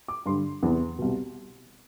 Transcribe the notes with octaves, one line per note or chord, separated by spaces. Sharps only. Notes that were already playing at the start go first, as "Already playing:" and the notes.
D6
G2 D3 C6
E2 C3 E3
C2 B2